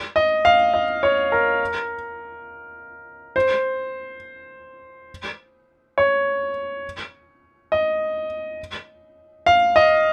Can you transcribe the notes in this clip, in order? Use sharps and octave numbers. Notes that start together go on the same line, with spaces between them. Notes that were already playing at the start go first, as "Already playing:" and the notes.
D#5
F5
D#5
C#5
A#4
C5
C#5
D#5
F5
D#5